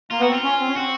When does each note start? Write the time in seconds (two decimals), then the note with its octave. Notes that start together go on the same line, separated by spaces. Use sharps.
0.11 A#3 F4
0.20 B3
0.22 F#4
0.28 C4
0.33 F4
0.43 C#4
0.60 C4
0.68 C#4
0.76 C4 F#4